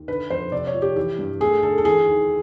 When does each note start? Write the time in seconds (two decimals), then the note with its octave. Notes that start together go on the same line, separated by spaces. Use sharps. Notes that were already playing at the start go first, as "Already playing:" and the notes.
Already playing: D#2
0.08 D3 B4
0.30 F2 C5
0.52 C3 D5
0.67 C#5
0.74 F3
0.82 G4
0.96 E3 G4
1.19 G2
1.41 A3 G#4
1.63 D3 A4
1.78 A4
1.84 E3 G#4
2.07 D#2